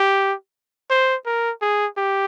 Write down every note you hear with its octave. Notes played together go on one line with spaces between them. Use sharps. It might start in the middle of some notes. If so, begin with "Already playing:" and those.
Already playing: G4
C5
A#4
G#4
G4